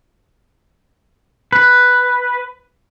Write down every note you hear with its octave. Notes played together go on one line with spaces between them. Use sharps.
B4